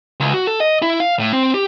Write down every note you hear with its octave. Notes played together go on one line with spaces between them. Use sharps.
C#2
F#4
A4
D#5
E4
F5
A2
C4
G4